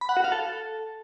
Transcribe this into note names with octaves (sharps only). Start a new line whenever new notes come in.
B5
F#5
F#4
F5
A4